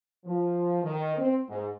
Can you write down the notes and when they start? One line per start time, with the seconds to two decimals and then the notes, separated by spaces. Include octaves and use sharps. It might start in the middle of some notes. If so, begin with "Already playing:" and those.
0.25 F3
0.82 D#3
1.16 C4
1.47 G#2